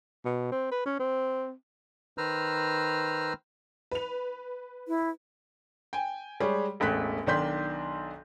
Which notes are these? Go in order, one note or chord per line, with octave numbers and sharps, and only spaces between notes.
B2
C4
B4
C#4
C4
D#3 B4 C5 A#5 E6 F6
B4 F7
E4
G5 G#5
G3 G#3 G4 G#4 C#5
E1 A1 A3 F#6 B6
B1 D#3 D4 C6 G6 B6